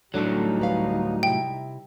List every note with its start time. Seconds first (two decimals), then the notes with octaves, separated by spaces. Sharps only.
0.14 A2 F#3 G3 A3 D4 D#4 A4
0.60 D2 B4 F5
1.23 C3 E4 E5 G5